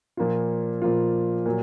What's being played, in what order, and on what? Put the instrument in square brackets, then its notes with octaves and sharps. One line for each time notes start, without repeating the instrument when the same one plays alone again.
[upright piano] A#2 F3 A#3 F4
A#2 F3 A#3 F4
A#2 F#3